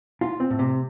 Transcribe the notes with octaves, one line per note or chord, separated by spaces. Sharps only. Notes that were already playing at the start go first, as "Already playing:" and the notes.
F4
C4
A2
C3